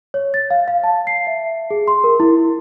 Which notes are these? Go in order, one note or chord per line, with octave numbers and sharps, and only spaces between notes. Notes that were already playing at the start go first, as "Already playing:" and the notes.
C#5
A6
F5
F5
A5
C7
E5
G#4
C6
A#4
E4